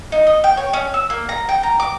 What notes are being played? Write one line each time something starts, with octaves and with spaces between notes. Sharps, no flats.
D#4
D#5
G5
C#5
C#4
E6
A#3
A#5
G5
A#5
D6